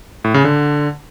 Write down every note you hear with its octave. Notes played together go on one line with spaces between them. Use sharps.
A2
C#3
D3